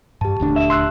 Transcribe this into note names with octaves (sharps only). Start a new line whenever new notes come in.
G2 G4 A5
D#1 D2 D4
E5
C6 E6 F#6